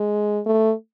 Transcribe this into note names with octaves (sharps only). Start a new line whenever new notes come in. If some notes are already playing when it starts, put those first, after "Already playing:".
Already playing: G#3
A3